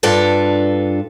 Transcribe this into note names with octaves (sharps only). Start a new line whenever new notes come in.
G2 D4 F4 A4 B4